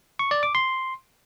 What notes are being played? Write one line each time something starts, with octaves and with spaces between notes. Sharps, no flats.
C#6
D5
D6
C6